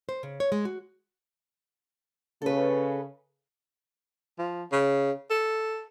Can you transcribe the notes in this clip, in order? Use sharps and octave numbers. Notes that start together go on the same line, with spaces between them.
C5
C#3
C#5
G#3
F#4
C#3 A4 B4
F3
C#3
A4